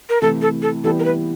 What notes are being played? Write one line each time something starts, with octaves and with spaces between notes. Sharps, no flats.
A#4
C3 E3 A3 A4
A4
A4
E3 G3 B3 E4 G4 A4
A#4
B4